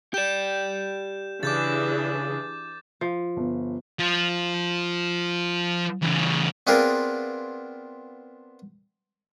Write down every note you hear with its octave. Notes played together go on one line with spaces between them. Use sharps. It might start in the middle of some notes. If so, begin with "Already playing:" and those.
G4 D5 G6 E7
C#3 E3 D4 G#4 D6 G6 A6
F3
G1
F3
E2 C#3
B3 C4 D4 F4 G#4 A#4